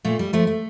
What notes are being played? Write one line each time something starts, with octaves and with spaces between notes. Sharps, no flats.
A#2 A3
G3
F3 A3
A3